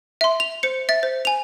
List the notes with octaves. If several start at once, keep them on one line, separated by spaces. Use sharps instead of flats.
E5 C6
F7
C5 C#7
E5 A6
C5
G#5 F7